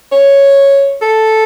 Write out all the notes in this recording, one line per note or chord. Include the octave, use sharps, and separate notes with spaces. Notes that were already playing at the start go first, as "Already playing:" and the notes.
C#5
A4